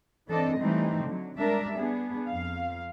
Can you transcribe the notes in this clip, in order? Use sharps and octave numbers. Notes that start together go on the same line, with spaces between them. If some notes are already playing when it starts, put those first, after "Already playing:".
E3 C4 D4 A4 D5 D#5
E3 G3 A3 C4 D#4
D3 F#3
G3 G#3 D4 A#4 D5 E5
B3 D4 G#4
F2 F5